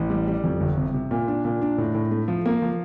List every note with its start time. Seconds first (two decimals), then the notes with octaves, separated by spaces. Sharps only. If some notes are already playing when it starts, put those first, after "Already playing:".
Already playing: A1
0.10 G3
0.27 G3
0.44 F2
0.61 G1
0.77 C3
0.94 C3
1.11 A#2
1.28 D4
1.45 A#2
1.62 D4
1.78 A2
1.95 A2
2.11 A3
2.28 F3
2.46 A#3
2.62 F3